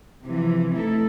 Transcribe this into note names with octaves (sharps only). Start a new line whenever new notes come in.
C3 E3 F3
A3 D#4 E4 A4